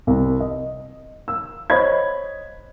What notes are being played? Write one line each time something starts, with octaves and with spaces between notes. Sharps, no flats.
C2
D#5
E6
C5 C#5 D#5 B5 C#6 G#6